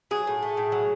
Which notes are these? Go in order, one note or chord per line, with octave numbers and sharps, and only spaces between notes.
F#3 G#4
A2
A3
A2
F#3